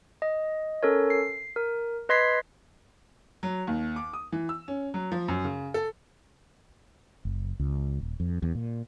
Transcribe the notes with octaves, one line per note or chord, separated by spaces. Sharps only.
D#5
C#4 A4 A#4 C#5
C7
A#4
B4 D#5 C6 G#6 B6 C7
F#3
D#2
D6
D#6
E3
E6
C#4
F#3
F3
F#2
C#3
A4
F#1
C#2
D#1
F2
E2
A#2